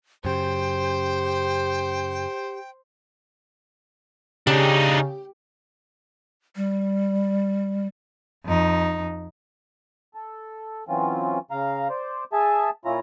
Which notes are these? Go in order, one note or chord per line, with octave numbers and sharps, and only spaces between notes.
F#2 C#3 G4 C5 G5
C#3 D4 D#4 G4
G3
F2 D#4
A4
E3 F#3 C4 C#4 F4
C#3 F5 A#5
C5 D5
G#4 E5 G#5 A5
A#2 C#4 E4 F4 A#5